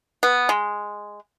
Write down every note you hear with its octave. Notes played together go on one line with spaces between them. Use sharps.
B3
G#3